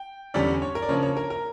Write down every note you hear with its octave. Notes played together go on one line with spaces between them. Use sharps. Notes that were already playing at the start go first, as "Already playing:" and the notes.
Already playing: G5
E2 D3 G3 C#4 D5
C#5
A#4
D5
C#3 F3 A#3 D4 C#5
C#5
A#4
A#4